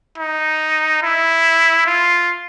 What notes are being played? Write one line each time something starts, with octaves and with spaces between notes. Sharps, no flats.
D#4
E4
F4